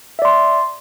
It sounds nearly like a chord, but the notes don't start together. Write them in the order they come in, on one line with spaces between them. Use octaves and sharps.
E5 D5 C6